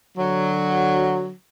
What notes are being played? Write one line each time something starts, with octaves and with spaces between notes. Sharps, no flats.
D3 F#3